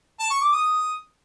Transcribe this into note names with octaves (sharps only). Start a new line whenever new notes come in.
A5
C#6
D6
D#6